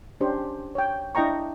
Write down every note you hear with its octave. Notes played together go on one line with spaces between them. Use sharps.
C#4 D4 G4 C5
C#5 G5
D4 E4 D#5 G5 A#5 C#6